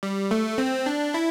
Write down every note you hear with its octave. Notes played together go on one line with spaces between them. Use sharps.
G3
A3
C4
D4
E4